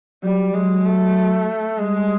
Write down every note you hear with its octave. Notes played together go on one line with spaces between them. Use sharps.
F#3 G3
F#3 G#3
A3
G3 G#3